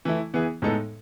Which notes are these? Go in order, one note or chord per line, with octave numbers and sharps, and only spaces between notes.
E3 A3 E4
E3 B3 E4 G#4
A2 G#3 B3 D#4 A4